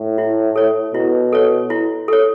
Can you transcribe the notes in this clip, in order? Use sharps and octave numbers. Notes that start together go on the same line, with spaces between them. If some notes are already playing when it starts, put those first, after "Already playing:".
Already playing: A2
E4
A4 C#5
B2 E4
A4 C#5
E4
A4 C#5